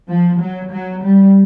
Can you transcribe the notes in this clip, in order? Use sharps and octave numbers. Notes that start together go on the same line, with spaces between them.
F3
F#3
F#3
G3